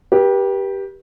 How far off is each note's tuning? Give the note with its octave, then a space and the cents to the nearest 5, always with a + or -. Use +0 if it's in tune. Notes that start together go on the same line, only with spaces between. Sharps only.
G4 +0 B4 -40